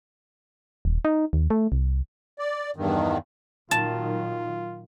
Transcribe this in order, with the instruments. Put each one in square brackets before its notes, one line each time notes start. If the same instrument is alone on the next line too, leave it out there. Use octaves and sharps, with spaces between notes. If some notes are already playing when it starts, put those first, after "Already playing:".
[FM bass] D#1
D#4
D#2
A3
C2
[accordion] D5
E2 G2 D#3
[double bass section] A#2 D#3 F#3 [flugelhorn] F4 [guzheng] A5